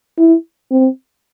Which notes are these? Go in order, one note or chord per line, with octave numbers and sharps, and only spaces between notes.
E4
C4